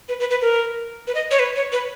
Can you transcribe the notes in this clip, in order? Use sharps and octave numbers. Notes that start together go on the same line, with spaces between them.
B4
B4
B4
A#4
B4
D#5
C#5
B4
C#5
B4